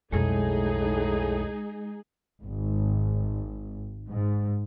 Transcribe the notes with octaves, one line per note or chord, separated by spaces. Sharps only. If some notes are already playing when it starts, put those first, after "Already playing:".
B1 F2 A2 G#3 D#4 G#4
G#1
G#2